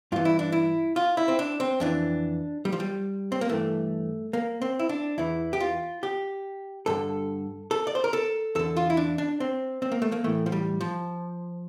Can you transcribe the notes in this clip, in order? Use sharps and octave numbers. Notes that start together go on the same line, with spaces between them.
G2 E3 F4
E4
D4
E4
F4
E4
C4
D4
C4
F2 E3 D4
G3
F3
G3
C4
A#3
G2 E3 A3
A#3
C4
E4
D4
E2 E3 E4
G4
F4
G4
G2 D3 A4
A4
D5
C5
A#4
A4
E2 D3 A4
F4
E4
D4
D4
C4
C4
A#3
A3
A#3
A2 E3 A3
F3
G3
F3